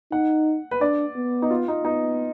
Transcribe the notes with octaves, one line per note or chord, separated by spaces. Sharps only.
D#4 F#5
B4
D4 D5
B3
D#4
F4
D#4
B3 D#4